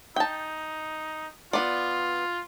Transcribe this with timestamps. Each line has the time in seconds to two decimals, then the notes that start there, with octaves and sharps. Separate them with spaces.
0.16 D#4 G5 A5
1.53 B3 F4 D5